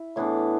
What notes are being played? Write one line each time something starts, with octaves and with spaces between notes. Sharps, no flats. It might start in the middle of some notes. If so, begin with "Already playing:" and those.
Already playing: E4
A2 E3 B3 D4